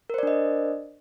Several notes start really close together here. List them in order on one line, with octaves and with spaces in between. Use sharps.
A#4 C5 D5 D4 D#5